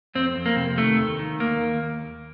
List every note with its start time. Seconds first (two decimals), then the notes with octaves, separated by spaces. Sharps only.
0.15 F2 C4
0.36 F2
0.46 A#3
0.56 C3
0.78 D#3 A3
0.98 D#2
1.19 D#3
1.40 D#2 A#3
1.62 D#2